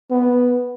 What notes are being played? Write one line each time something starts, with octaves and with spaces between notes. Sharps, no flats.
B3